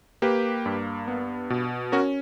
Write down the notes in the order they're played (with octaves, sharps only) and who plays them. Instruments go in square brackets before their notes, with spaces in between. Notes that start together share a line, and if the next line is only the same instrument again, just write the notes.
[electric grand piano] A#3 G4 B4
G2
B3
B2
C#4 F#4 A#4